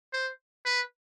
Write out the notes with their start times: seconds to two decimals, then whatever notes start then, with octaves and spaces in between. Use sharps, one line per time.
0.13 C5
0.65 B4